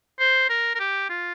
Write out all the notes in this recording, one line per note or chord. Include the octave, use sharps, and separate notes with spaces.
C5
A#4
A#4
G4
F4